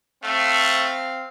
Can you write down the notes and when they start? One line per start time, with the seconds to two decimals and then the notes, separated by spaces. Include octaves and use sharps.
0.24 A3 C4 F5